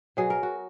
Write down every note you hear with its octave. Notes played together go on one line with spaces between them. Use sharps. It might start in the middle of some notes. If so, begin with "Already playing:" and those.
B2 F#3 G#4
A#4
F#4